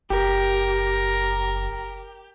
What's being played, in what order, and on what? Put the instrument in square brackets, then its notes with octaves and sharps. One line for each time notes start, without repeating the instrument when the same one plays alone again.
[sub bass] F#1 [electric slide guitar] G4 [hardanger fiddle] A#4